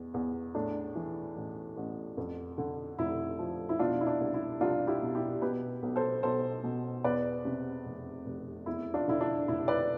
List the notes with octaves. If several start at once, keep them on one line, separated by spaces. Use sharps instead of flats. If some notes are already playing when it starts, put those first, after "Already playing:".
Already playing: E2
E2
A2 D4
E3
A1
A1
F2
D3
F1 E4
F3
E4
B2 D4 F4
E4
D4
C2
E4
C2 D4 F4
E4 G4
B2
E4 G4
B2 G4 B4
B1
A4 C5
B1 A4 C5
B2
E2 B4 D5
C3
F1
F1
E2 E4
D4 F4
D3 E4
D4
F1 E4
B4 D5